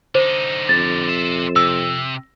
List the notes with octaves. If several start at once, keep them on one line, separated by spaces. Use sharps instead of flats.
D3 D#4 C5
F2 A6
C5 E5
C3 E6